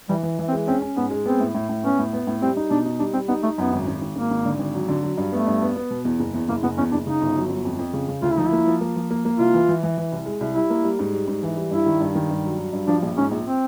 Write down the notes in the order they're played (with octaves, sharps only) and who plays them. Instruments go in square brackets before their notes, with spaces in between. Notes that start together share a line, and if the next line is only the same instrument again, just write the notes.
[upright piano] E3 [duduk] G3
[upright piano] E3
E3
[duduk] C4
[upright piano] G#3
[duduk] C4 [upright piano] C#4
[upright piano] C#4
[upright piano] G#2 [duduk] B3
[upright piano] G#3
[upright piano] B3 [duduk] C4
[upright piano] A2
A2
A2
[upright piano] B3 [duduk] C#4
[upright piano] A2
B3
A2
[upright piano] G3 [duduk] C4
[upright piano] D#4
[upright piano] B2 [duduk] D4
[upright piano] D#4
[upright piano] G3 [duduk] D4
[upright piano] G3 [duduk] C4
[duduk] B3 [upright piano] D#4
[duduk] A3 [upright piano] D#4
[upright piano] F#2 [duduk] B3
[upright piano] G#1
G#1
G#1
[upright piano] G#1 [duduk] A#3
[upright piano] G#1
D3
G#1
F#3
D3
F#3
G2
[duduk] A3 [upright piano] B3
[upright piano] G2
B3
B3
B2
E2
F#1
E2
[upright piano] F#1 [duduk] A#3
[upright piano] F#1 [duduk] B3
[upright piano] E2 [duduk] C#4
[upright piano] F#1 [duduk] D4
[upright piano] C#3 [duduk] D#4
[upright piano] G1
F#3
G1
F2
F2
C#3
C#3
[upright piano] D2 [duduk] F4
[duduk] E4
[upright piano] F3 [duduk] D#4
[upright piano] A#3 [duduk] E4
[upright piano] F3
A#3
F3
A#3
A#3
[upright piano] C2 [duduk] F4
[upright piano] E3
E3
E3
E3
C2
G#3
C2
[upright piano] G3 [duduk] E4
[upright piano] A#3
G3
G#2
G3
G#2
E3
G3
[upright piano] G2 [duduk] E4
[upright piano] D#3
G2
D#3
G2
F#3
F#3
G2
[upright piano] F3 [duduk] D4
[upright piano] A#1
[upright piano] G#2 [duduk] C#4
[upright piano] A#1
[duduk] C4